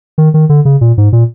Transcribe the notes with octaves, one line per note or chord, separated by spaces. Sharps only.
D#3
D#3
D3
C#3
A#2
G#2
A#2